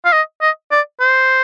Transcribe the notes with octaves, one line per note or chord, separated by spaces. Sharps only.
F5
D#5
D#5
D5
C5